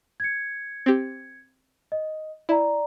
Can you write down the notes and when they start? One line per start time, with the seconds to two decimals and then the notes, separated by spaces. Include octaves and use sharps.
0.20 G#6 C#7
0.86 C4 G4
1.92 D#5
2.49 E4 D5 A#5